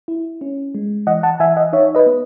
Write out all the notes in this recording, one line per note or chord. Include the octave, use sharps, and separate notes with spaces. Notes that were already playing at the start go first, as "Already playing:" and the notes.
E4
C#4
G#3
E3 D#5 F#5
F#5 A5
E3 E5 G#5
D#5 F#5
D#4 C#5 E5
B4 D#5
B3